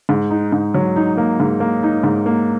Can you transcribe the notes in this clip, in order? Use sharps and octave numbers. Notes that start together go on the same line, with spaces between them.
G#2
D#4
G#2
F#3
D#4
A#3
G#2
A#3
D#4
G#2
A#3